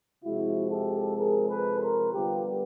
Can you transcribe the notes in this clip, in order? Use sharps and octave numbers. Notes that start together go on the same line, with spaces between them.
C3 F3 G#3 E4 F#4
G4 A4
G#4 A#4
A4 B4
A#4 C5
D3 G3 B3 F4 G4